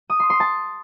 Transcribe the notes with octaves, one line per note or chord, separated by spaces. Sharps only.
D#6
C6
C6
A5